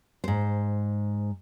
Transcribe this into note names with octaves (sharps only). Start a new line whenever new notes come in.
G#2 C5